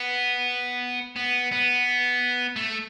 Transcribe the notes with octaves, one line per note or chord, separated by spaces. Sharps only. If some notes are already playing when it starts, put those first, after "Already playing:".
Already playing: B3
B3
B3
A3